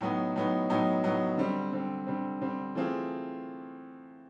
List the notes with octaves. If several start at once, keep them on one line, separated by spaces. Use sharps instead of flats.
A2 F#3 B3 D#4
A2 F#3 B3 D#4
A2 F#3 B3 D#4
A2 F#3 B3 D#4
D3 G3 C4
D3 G3 C4
D3 G3 C4
D3 G3 C4
E3 A3 C4 F4 G#4